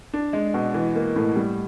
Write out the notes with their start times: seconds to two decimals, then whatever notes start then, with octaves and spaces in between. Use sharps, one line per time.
0.14 D4
0.33 G#3
0.54 B2
0.74 E3
0.95 A#3
1.16 A2
1.36 G3